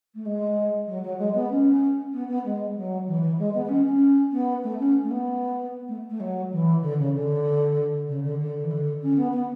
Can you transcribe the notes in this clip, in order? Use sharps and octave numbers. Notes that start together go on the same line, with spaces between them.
A3
G#3
F#3
F#3
G#3
B3
C#4
B3
B3
G#3
F#3
E3
E3
G#3
B3
B3
C#4
C#4
B3
A3
C#4
A3
B3
A3
A3
F#3
E3
D3
C#3
D3
C#3
D3
D3
E3
D3
C#4
B3
B3